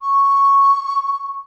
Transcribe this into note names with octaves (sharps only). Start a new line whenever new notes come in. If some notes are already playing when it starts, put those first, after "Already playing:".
C#6